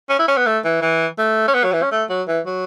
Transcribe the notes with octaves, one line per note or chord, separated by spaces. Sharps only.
C#4
E4
C#4
B3
A3
E3
E3
A3
C#4
B3
F#3
E3
C#4
A3
F#3
E3
F#3